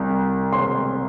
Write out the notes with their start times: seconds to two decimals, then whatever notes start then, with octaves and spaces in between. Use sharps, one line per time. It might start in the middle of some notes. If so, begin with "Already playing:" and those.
Already playing: C2
0.53 C6